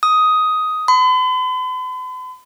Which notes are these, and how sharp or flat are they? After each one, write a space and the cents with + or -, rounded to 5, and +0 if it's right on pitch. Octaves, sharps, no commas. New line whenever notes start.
D#6 +10
B5 +45